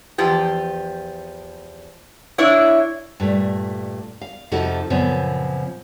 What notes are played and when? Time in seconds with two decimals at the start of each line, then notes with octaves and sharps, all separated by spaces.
0.18 E2 F3 G4
2.38 D4 E4 C#5
3.20 G2 A#2 A3
4.22 F5
4.52 F2 C3 F3 D#4 F#4 A4
4.90 F#2 A#2 C#3 F3 B3 C4